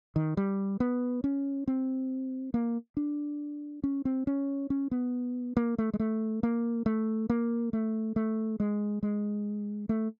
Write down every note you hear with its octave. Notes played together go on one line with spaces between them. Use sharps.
D#3
G3
B3
C#4
C4
A#3
D4
C#4
C4
C#4
C#4
B3
A#3
A3
G#3
A3
A#3
A3
A#3
A3
A3
G#3
G#3
A3